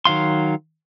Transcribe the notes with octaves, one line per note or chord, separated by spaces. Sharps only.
D#3 F#3 F5 C6